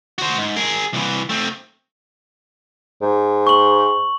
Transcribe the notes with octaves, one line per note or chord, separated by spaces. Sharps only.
F#4 C5
G#2
G#4 A#4
C2 E3
A3 C4
G#2
C#6 F#7